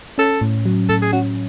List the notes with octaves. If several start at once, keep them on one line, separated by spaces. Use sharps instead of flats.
C#4 A4
A2
F#3
A2 A4
G#4
C#4 F#4